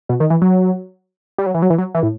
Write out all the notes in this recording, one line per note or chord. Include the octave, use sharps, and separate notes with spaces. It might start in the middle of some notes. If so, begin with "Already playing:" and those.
B2
D#3
E3
F#3
G3
F#3
E3
F#3
E3
F#3
E3
A2